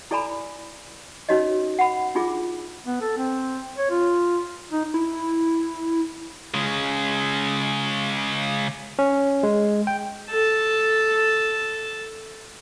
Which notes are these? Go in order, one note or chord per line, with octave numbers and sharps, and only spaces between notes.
E4 A4 D5 G#5 A#5 B5
C#4 D#4 F#4 C#5 D#5
F#5 B5
D4 D#4 F4 G#4 D6
B3
A4
C4
C#5
F4
D#4
E4
C#3 G#3
C#4
G#3
G5
A4 A5